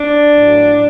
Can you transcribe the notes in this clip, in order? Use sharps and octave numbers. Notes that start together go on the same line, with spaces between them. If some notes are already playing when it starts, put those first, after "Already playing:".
Already playing: D4
A2 F#3